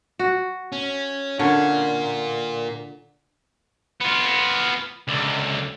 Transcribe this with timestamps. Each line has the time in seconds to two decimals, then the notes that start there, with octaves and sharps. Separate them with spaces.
0.19 F#4
0.72 C#4
1.39 D3 C#4 F4 A#4
4.00 B3 F4
5.08 C#2 D3